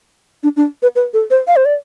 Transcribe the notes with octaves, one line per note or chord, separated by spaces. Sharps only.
D4
D4
B4
B4
A4
C5
F5
C5
D5